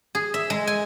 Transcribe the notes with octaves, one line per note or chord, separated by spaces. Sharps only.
G#4
E5
G#3
G#5